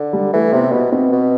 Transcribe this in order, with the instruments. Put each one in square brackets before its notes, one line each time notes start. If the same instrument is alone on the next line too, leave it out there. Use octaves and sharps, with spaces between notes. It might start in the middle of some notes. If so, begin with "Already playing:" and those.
Already playing: [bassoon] D3
[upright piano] G3
[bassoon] E3 [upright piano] A3
[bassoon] C3 [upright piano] B3
[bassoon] B2 [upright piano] B3
[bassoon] B2 [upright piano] C4
[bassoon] B2